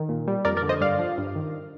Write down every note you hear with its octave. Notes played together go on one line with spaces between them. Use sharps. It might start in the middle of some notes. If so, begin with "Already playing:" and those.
Already playing: D#3
A#2
G3
F2 A#4 D5
A#4 D5
D3
C5 D#5
G2 D5 F5
F3
G2
D#3